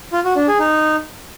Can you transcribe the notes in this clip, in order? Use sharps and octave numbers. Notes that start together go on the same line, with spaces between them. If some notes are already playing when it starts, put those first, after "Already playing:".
F4
F#4
D4
G#4
D#4